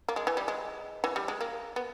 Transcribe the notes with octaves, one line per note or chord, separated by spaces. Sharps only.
A#3
G#3
E3
G3
G#3
E3
G3
G#3
A#3
B3